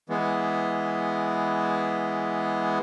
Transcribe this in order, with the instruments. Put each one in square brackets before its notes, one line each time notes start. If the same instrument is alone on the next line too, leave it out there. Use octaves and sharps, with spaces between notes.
[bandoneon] E3 G#3 B3